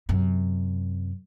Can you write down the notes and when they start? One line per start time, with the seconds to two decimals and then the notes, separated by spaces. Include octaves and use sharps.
0.09 F#2 C3